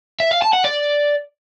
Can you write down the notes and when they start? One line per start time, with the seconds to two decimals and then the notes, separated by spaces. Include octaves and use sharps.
0.20 E5
0.31 F5
0.42 A5
0.53 F#5
0.65 D5